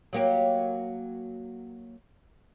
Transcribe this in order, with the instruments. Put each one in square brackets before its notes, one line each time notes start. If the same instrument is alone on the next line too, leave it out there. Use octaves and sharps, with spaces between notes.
[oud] F#3 A#3 G4